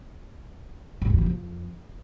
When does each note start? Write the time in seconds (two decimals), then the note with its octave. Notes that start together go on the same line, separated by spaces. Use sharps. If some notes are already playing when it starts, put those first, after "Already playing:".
1.02 G#2
1.10 E2
1.18 F3
1.26 F2